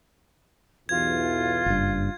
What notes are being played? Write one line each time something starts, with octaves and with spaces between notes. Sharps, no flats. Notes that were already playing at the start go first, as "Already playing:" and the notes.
B1 E2 E3 F4 G#6
F#1 G2